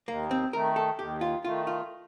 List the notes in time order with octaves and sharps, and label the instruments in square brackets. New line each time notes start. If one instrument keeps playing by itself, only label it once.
[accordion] D#2 [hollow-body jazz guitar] A#3
[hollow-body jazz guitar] C4
[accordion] D#3 A3 [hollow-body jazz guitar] A#4
[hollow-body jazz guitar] A4
[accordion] D#2 [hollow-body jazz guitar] G4
[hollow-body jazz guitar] F4
[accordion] D#3 A3 [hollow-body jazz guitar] F4
[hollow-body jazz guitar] F4